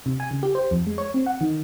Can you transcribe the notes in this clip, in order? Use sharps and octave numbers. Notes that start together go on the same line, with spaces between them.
C3
G#5
C#3
G4
C5
F2
G#3
C#5
C4
F#5
D#3